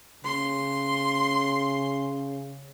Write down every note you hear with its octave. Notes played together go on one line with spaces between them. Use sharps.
C#3 C6